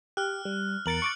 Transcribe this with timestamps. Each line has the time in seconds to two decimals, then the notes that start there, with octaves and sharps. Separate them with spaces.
0.17 G4 F6 F#6
0.45 G3
0.86 E2 A#4 A6 C#7 D7 F#7
1.02 C#6 D6 A6